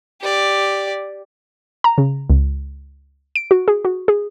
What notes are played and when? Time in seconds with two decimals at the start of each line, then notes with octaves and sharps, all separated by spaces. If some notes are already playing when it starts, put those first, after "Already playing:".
0.22 G4 D5
1.84 A#5
1.98 C#3
2.30 C#2
3.36 D7
3.51 F#4
3.68 G#4
3.85 F#4
4.08 G#4